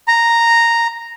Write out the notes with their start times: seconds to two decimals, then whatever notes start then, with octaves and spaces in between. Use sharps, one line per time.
0.08 A#5